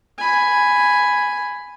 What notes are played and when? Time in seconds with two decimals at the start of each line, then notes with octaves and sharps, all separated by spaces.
0.18 G#5 B5